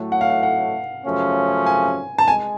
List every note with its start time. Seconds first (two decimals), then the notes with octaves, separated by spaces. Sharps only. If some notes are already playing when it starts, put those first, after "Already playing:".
Already playing: A2 F#3 A3
0.12 F#5
0.21 F5
0.30 F#5
0.43 F#5
1.05 F#2 C#3 F3 A3 C#4
1.66 G#5
2.18 A5
2.28 G#3 G#5